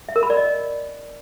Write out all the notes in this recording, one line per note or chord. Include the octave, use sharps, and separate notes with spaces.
E5
A#4
B5
D5
D#5